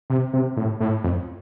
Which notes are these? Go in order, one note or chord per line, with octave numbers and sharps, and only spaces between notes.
C3
C3
A2
A2
F2